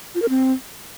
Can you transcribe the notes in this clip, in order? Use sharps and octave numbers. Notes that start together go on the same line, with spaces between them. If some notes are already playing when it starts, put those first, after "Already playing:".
F4
A#4
C4